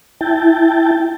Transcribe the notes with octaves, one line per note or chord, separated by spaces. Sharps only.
E4 G5 A5